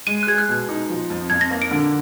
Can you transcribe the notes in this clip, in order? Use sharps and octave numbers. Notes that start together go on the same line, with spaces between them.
G#3 D#7
F#6
G#4 G#6
F#6
B2
D#4
F3
F2
F2 G#6
A#6
A#3
D7
D3